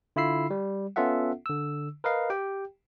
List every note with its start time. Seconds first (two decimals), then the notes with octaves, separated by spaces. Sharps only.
0.16 D3 E4 F4 B5 E6 C7
0.50 G3
0.96 B3 C#4 F4 A4 E5 F#5
1.46 D3 E6
2.04 A#4 B4 D#5 F5
2.30 G4 G5